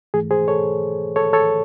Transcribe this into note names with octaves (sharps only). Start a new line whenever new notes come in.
G#2 E3 A3 G#4
G#4 C5
A4 C#5
A4 C#5
A4 C#5